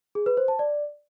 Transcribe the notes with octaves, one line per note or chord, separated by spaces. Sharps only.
G#4
B4
C5
A5
D5